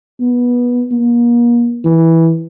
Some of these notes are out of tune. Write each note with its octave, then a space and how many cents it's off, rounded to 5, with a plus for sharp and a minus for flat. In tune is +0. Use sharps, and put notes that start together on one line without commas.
B3 -15
A#3 +35
E3 -10